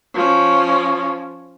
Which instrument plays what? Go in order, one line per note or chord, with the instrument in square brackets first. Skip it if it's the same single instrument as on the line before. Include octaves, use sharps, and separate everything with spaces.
[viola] F3 C#4